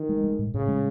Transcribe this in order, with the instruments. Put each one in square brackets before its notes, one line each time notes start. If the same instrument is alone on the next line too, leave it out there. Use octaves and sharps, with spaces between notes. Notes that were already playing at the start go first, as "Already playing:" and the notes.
Already playing: [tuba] D#3
[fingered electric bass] G#3
G#3
A2
[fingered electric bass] A2 [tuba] C#3
[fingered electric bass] G#3